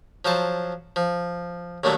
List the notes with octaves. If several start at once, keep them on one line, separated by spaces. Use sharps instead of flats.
F3 F#3 C5 A5
F3
D#2 A2 D3 F#3 A3